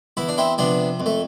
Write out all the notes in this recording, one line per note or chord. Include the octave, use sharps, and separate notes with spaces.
E2 E4
D4
C4 E4
C3 F3 B3 D4
F2
A3